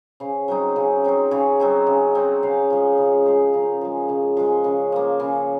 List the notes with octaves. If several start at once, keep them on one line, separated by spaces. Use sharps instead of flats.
C#3 C5
F#3 C4 D#4
C#3
F#3 C4 D#4
C#3 C#5
F#3 C4 D#4
C#3
F#3 C4 D#4
C#3 F5
F3 G#3
C#3
F3 G#3 C5
C#3 A#4
F3 G#3
C#3
F3 G#3
C#3
F3 A#3
C#3